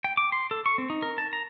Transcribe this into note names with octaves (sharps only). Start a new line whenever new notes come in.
G5
D6
C6
A4
C#6
C4
D#4
A#4
A5
A#5